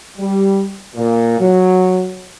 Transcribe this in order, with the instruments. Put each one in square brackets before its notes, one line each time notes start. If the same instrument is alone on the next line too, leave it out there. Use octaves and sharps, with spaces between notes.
[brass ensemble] G3
A#2
F#3